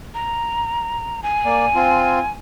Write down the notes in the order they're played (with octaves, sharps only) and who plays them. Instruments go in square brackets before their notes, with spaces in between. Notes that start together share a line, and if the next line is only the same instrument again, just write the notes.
[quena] A#5
G#5
[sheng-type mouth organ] A#3 D5
C4 F4